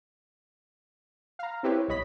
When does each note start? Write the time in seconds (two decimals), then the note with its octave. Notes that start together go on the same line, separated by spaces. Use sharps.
1.39 F5 A#5
1.63 C4 E4 G4 B4 C#5
1.88 B1 C#5 D#5 B5 B6